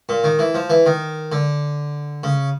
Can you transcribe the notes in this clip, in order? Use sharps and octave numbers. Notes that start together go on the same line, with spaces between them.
A#2
D#3
E3
F3
E3
D#3
D3
C#3